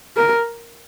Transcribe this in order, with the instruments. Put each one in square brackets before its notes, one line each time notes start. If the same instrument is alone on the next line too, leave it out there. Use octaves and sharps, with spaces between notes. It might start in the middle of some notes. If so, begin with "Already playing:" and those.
[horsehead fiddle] A#4